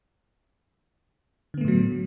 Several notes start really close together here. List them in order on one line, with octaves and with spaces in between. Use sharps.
D3 B3 A3 A2 F#3